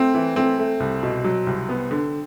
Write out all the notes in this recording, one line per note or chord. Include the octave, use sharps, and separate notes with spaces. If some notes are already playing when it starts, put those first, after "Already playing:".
Already playing: A3 C4
E3
A3 C4
A3
C2
B2
F#3
C2
B3
D3